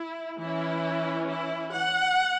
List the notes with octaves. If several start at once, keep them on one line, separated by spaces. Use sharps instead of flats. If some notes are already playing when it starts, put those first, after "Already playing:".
Already playing: E4
E3 C#4 E4
E4
F#5